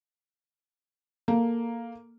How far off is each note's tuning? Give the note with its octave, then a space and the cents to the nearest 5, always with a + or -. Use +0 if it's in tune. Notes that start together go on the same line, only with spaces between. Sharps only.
A#3 +0 A4 +0